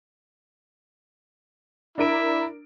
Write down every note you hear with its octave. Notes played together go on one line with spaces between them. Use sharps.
D4 E4 A#4 D7